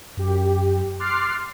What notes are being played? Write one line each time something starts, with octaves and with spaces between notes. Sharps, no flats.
F#2 G4
C6 D6 F6 F#6 A6 C7